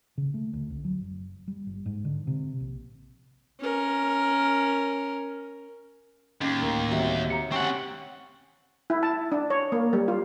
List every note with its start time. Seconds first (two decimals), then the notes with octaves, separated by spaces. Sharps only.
0.18 C#3
0.34 A3
0.53 D2
0.70 C2
0.85 F#3
1.01 F#1
1.48 G3
1.67 G1
1.86 G#2
2.05 D3
2.27 C3
2.60 A#1
3.60 C#4 A#4
6.41 D#2 A2 C#4
6.62 D2 A2 A#4
6.92 C3 D#3 F#3 G3
7.30 G4 A#5 C#7
7.52 C4 C#4 F#5 C#6
8.90 E4
9.03 A5
9.32 D4
9.50 C#5
9.72 A#3
9.93 G3
10.08 F4